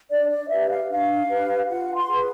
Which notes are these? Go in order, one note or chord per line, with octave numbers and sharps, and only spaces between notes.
D4 D5
D5
G4 B4 E5
F5
D4 F5
G4 B4
F4 F#5
C6
G#4 B4